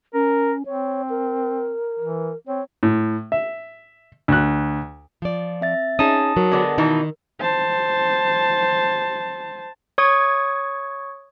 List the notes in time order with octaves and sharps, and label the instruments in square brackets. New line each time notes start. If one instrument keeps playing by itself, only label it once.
[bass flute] C#4 [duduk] A#4
[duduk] C4 [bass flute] C#5
[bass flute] A#4
[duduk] E3
[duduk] C4 [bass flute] C#5
[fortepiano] A2
E5
D2 F#6
[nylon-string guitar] F3 D5
[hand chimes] C4 E5 A6
[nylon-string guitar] C#4 G#4 [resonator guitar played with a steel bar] D#4 [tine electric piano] A5 D#6
[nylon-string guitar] F#3 [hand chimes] A#4
[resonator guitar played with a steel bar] D3 G#3 B3
[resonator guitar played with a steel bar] B2 E3 D#4 [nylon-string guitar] D#3
[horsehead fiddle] C5 A5
[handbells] C#5 C#6 D#6 G#6